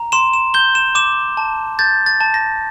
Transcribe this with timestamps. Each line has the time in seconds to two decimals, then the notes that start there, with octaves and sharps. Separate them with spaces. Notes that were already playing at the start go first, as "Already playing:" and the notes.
Already playing: A#5
0.12 C6 E7
0.33 E7
0.54 G6 G7
0.75 E7
0.95 D6 E7
1.37 A5
1.79 G6 A6
2.06 A6
2.20 A5
2.34 A#6